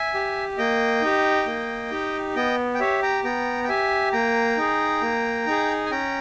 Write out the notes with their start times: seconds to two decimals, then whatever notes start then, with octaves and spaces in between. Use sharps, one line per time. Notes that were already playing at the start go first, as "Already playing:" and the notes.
Already playing: E5 G#5
0.14 G4
0.58 A#3 D#5 G5
1.02 D#4 G4
1.46 A#3
1.91 D#4 G4
2.36 B3 D#5 G5
2.75 G5
2.80 G4 C#5 E5
3.02 G5 A#5
3.24 B3 G5 A#5
3.64 G5
3.69 G4 E5 G#5
4.13 A#3 G5 A#5
4.57 D#4 G#4
5.01 A#3
5.47 D#4 G#4
5.86 G#5
5.90 C#4 G5 A#5